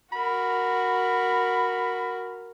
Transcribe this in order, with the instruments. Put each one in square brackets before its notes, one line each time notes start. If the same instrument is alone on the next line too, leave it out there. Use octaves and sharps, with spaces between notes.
[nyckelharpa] F#4 A#4 [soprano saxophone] B5